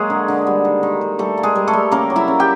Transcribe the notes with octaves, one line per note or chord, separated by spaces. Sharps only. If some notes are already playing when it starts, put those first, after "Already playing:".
Already playing: F#3 G#3 A#3 G#4
D3
D3
G3
D#3
D#3
G3
G3 A3 A4
A#3
G#3 G#4
G3
A3 A4
G3
C#3 A#3 A#4
F#3
E4 E5
C#3
G4 G5